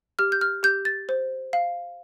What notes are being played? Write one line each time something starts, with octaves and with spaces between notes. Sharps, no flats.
G4 F6
G6
F6
G4 G6
A6
C5
F5